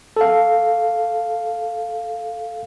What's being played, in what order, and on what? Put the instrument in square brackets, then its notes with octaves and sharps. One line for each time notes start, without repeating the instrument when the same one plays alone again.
[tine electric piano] A4 F5